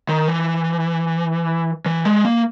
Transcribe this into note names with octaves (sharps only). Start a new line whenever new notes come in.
D#3
E3
E3
G#3
A#3